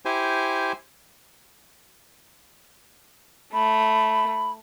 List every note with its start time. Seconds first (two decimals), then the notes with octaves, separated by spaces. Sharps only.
0.05 E4 G4 C5 G#5
3.54 A3 B5